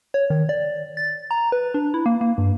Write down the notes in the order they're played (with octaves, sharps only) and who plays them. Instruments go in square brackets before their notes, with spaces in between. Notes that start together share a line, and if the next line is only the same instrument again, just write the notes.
[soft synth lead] C#5
D#3
D5
A6
A#5
B4
D4
E4
A#3
A#3
G2